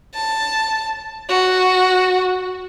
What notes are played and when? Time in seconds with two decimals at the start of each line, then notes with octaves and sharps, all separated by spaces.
0.15 A5
1.29 F#4